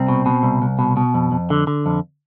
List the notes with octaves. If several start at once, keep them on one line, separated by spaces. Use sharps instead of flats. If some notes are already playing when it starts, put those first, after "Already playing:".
Already playing: C2 C4
B2
B2
C2
C2
B2
B2
F2
F2
D3
D3
F2